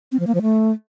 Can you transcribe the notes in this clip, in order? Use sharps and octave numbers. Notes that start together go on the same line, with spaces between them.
C4
F3
A#3
F3
A3